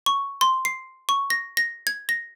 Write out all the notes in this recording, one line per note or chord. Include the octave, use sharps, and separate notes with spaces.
C#6
C6
C7
C#6
A#6
A#6
G#6
A#6